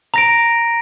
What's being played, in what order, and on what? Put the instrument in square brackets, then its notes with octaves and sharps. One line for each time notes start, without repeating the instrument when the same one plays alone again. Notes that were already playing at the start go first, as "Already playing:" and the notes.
[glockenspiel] A#5 A#6 D7